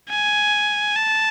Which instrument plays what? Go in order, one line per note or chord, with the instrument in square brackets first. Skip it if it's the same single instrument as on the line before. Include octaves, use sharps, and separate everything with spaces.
[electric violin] G#5
A5